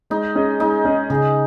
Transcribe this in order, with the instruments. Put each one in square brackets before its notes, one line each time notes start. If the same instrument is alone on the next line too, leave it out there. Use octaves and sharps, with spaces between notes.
[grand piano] G#3 [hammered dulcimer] D#4
[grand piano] C#4 G#4 D#5
[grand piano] G#3 [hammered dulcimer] D#4
[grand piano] C#4 G#4 D#5
[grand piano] C#3 [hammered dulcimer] G#4